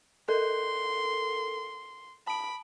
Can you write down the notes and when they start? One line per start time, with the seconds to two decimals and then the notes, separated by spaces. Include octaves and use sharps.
0.29 A4 A#4 C6
2.27 A5 B5 D7